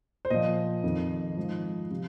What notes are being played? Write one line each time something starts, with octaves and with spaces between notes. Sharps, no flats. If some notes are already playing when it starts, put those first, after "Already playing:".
C5
A#2 F3 D#5
F2 D#3
G#2 F3
C3 F3